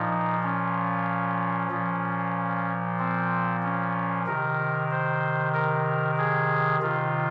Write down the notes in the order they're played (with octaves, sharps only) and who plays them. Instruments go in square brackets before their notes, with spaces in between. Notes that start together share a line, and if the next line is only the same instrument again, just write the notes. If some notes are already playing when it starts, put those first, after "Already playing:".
Already playing: [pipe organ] A#2 F3 D#4
C#4
A#2 F3
C4
C#4
C3 D#3 A#4
C5
A#4
G#4
C3 D#3 F4